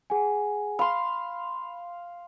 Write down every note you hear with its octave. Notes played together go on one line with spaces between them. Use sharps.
G#4 F#5 G#5
F5 B5 C6